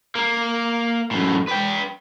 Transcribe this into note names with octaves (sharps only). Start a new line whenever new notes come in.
A#3
F#2 A2
B4 G5